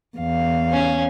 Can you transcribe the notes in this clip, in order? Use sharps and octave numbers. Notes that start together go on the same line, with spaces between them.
E2 F5
C#4